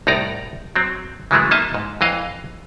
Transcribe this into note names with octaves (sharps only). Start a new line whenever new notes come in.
C2 A2 D#4 D5 A#5
F#3 C4
C#3 E3 F#3 G#3 A3
A#3 D#4 D#5 E5 A5
G#2
F2 E3 D#5 F5